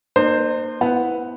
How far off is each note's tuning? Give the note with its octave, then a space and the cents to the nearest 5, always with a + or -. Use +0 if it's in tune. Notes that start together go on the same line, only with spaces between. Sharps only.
A#3 +0 D#4 -45 C5 +0
B3 +0 E4 -10 F#5 +0